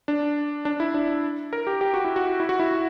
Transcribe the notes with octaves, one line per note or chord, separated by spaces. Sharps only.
D4
D4
E4
D4
A#4
G4
G4
F#4
E4
F#4
E4
F#4
E4